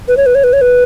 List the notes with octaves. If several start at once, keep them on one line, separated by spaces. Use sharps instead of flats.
B4
C#5
B4
C#5
B4
C#5
B4